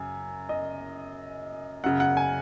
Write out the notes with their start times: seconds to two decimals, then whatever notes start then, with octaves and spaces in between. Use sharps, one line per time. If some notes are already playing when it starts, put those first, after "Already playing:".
Already playing: F#2 C#3 G#5
0.49 D#5
1.84 F#2 C#3 F#5
2.00 F#5
2.17 G#5